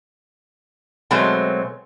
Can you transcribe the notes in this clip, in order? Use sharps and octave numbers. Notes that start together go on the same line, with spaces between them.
B2 F#3 G#3 A3 C4